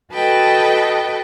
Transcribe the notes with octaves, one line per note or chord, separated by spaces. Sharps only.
F#4 A4 B4 D#5 G5 A5